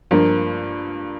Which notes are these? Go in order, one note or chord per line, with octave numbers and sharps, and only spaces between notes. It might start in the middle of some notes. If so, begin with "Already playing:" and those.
G2 F3 A#3